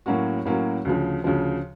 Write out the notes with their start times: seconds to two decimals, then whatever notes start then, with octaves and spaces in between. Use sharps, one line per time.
0.06 A2 F#3 A#3 C#4 F#4
0.45 A2 F#3 A#3 C#4 F#4
0.85 D2 C#3 F3
1.24 D2 C#3 F3